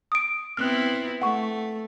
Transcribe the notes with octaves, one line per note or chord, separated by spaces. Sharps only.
D#6 D7
B3 C4 E4 F6 F#6
A3 F#5 C#6